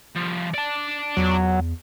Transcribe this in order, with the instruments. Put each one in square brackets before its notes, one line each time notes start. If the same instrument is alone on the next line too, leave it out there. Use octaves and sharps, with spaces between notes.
[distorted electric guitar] F3 G3
D5 A5
[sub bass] E2 [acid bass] F#3